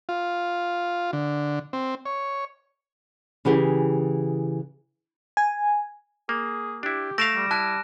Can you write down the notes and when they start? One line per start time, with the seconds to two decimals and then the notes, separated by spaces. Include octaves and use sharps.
0.09 F4
1.13 D3
1.73 C4
2.05 C#5
3.45 C#3 E3 G4 G#4
5.37 G#5
6.29 A#3 G#4
6.83 D4 E4 G4
7.18 A3 E5 F5 A#6 D7 E7
7.36 G3
7.51 E4 A5 F#6